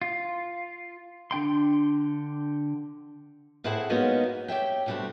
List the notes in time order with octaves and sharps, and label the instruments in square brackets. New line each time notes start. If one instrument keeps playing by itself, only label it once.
[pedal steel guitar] F4
D3 D4 G5 C6
[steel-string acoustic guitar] A2 C4 E4 G#4 C5 F#5
G#3 A#3 B3 C#4 D#4 F#4
G#2
G4 C#5 E5 G5
D2 B2 G3 A3 C4 F#4